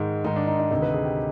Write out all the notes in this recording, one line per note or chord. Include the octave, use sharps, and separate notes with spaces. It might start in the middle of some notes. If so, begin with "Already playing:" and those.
Already playing: G#2 D#3 G#3 D#4
G#2 D#3 G#3 D#4
D4
D#4
D#4
D2 C3 D#3 D#4
B4
G#4
G4